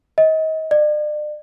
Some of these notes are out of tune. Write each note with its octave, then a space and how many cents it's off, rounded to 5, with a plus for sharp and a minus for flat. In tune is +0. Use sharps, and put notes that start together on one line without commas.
D#5 +30
D5 +40